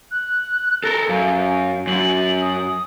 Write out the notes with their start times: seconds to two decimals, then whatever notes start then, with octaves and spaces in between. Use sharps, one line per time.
0.11 F#6
0.84 A4 A#4 A#6
1.09 F#2 F5
1.87 F#2 F#7
2.41 D#6